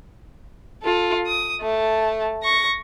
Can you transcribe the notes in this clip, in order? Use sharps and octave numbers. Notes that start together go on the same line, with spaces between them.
F4 A4
D#6
A3 A5
C#6 A#6